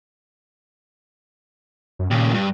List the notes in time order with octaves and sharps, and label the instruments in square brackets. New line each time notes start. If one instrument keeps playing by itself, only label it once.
[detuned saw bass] F#2
[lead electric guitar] D#2 C#3 [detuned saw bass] A#2
[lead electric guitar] G2